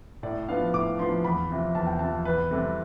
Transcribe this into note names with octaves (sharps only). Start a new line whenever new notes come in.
A2 D5
F3 B3 D4 F5
A2 D6
F3 B3 D4 C6
E2 B5
C3 F3
E2 A5
G5
C3 F3 A5
E2 B4
C3 G3 C4 A4